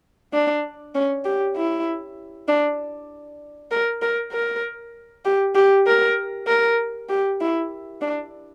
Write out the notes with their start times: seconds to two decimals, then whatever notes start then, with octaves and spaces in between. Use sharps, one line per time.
0.34 D4
0.95 C#4
1.25 G4
1.56 E4
2.48 D4
3.71 A#4
4.02 A#4
4.32 A#4
5.25 G4
5.55 G4
5.87 A#4
6.47 A#4
7.09 G4
7.41 E4
8.02 D4